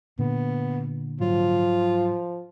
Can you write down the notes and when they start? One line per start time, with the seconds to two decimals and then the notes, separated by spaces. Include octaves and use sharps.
0.19 A#2 D3 B3
1.20 G#2 F3 F#3 F4